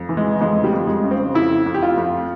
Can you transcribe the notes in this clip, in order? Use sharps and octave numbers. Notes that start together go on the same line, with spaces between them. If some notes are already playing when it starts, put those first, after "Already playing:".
Already playing: F2
E3
G#3
F2 G#3
G3
F2
G#3
C#3
C4
F2 E4
F2
G4
F4
F2